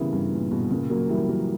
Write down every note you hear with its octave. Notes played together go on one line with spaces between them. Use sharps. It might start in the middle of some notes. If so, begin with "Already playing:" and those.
Already playing: C#3 E3 G3 A#3 B3 C#4
G2
A#2
G2 B2
A#2 C#3
F#3 A#3
E3 G3
F#3 A#3